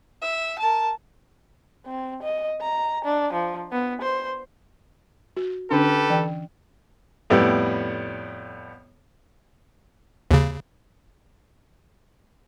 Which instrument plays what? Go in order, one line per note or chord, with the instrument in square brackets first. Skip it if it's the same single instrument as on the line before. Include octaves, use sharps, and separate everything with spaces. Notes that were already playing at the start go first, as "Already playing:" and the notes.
[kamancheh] E5
A#4 A5
[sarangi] C4
D#5
A#5
D4
F3
B3
C5
[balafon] F#4
[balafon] D3 C#4 D4 [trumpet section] G4 A4 B4
[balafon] E3 G5
[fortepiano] F2 A2 G3 B3
[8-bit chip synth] D#2 C#3